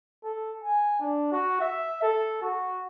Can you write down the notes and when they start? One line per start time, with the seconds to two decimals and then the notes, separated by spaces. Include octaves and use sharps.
0.23 A4
0.64 G#5
1.00 D4
1.32 F#4
1.61 E5
2.02 A4
2.42 F#4